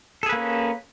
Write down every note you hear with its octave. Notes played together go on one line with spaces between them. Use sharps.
A#3 C#4 G#4 A4 B4